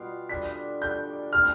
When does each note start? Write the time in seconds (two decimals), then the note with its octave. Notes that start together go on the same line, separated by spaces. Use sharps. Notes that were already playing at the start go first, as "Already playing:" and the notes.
Already playing: B2 G3 B3 F4
0.29 D3 G3 D4 B6
0.82 D3 G3 D4 G6
1.33 A2 G3 C4 F6